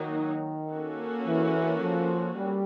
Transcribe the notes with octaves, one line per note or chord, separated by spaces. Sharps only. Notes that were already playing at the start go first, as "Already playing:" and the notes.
Already playing: D#3 F#3 A#3 D#4 F#4
A#3 C#4 F#4 A4
E3
F3
G3